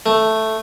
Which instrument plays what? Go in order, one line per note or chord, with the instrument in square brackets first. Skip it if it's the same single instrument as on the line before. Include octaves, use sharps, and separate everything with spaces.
[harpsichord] A3